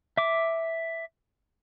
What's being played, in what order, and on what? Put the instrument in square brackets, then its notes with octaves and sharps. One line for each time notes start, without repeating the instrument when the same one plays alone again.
[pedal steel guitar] E5 D6